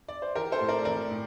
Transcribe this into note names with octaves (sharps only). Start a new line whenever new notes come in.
D5
C5
E3 G4 A#4
A4 C5
A2
A#4 D5
E3 A#4 D5
A2